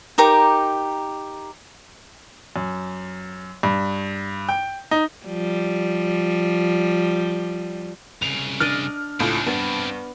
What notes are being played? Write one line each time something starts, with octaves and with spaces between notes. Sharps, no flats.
D#4 G4 A#4 D6
F#2
G2
G5
D#4
F3 G3
C2 C#3 F7
D4 D5 D#5 F6
C#2 A2 C4 D4 F4
G2 B3 D5